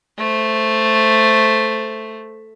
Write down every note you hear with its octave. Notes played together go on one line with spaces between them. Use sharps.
A3 C5